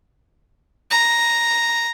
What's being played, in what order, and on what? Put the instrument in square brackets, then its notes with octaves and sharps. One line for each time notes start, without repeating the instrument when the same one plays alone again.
[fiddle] A#5